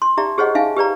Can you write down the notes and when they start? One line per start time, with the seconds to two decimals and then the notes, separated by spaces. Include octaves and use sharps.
0.02 C6
0.17 D#4 G4 D5 E5 A#5
0.38 G4 G#4 C5 C#5 D#5 F#5
0.55 D#4 E5 F5 G#5
0.76 G4 B4 D5 A#5